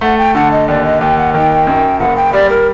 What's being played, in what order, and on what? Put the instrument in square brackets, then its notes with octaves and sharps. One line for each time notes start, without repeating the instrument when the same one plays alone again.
[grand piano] A3 [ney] F#5
[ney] G5
[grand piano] D3 [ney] F#5
[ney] D#5
[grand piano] D#2 [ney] D5
[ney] D#5
[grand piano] D#2 [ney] G5
[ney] F#5
[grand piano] D#3 [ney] G5
[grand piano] F#2
[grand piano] F#1 [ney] F#5
[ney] G5
[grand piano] G3 [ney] D5
[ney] A#4